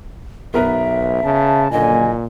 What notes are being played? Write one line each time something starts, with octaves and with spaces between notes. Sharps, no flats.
B1 B3 A#4 B4 E5
C#3 A5
F#1 A#2 D3 D#5 G#5